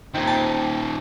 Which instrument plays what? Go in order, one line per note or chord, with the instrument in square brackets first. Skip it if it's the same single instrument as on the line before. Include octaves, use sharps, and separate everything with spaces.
[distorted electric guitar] A#2 D#3 [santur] C4 G#5
[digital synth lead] A5